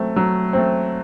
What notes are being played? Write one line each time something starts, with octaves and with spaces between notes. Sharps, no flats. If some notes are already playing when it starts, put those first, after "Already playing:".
Already playing: F#3 A3 C4
F#3
A3 C4